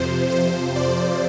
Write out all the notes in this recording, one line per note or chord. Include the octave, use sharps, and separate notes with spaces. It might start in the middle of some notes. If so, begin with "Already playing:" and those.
Already playing: F2 C3 F3 C5
C5
D5